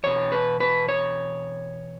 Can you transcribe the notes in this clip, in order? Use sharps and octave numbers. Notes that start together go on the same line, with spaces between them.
E2 B2 C#5
B4
B4
C#5